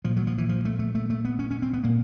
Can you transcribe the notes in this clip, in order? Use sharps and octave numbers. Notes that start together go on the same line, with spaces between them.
A#2 F3
F#3
F3
E3
F3
A3
A3
A3
A3
B3
C#4
C#4
C4
B3
A#2 A#3